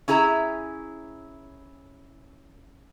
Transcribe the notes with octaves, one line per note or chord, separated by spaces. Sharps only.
C#4 E4 G#4 E5 A#5